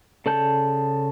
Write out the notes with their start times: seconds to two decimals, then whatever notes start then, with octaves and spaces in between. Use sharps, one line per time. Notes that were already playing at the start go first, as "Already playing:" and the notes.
0.26 C#3 A4 D5 A5 G6